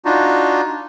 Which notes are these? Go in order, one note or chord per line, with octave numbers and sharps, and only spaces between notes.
D4 D#4 F4 F#4